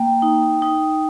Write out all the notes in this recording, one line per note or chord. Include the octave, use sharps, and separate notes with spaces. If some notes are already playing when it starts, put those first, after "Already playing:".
Already playing: A#3 G5
D#4
D#4